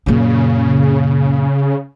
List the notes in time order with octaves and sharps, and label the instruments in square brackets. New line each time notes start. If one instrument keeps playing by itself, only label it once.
[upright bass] F#2 A#2 [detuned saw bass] C#3